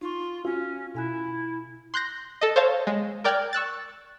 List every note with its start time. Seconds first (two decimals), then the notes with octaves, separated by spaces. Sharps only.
0.01 D#4 F4 C#6
0.45 C#4 F4 F#4
0.95 B2 E4 G#5 F#6
1.94 C6 F#6 G6 A#6
2.41 A4 D#5
2.56 C5 C#5 F5 A5
2.87 G#3
3.24 A#4 D5 G5 F6 F#6 G#6
3.53 C#6 E6 F#6 A6